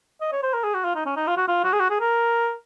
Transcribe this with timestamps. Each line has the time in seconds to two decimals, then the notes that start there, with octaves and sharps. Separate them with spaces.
0.21 D#5
0.32 C#5
0.43 C5
0.54 A#4
0.64 G#4
0.74 F#4
0.85 F4
0.95 D#4
1.06 C#4
1.17 D#4
1.27 F4
1.37 F#4
1.48 F4
1.64 F#4
1.73 G#4
1.80 F#4
1.90 G#4
2.00 A#4